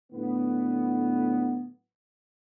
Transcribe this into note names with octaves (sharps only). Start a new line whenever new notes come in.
A2 D3 F#3 B3